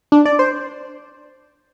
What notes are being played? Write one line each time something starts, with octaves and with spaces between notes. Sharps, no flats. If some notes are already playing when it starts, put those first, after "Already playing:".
D4
D5
C5